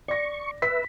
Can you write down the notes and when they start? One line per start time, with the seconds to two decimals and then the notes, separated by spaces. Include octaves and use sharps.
0.08 D5 C#6 A#6
0.62 B4 E5 B6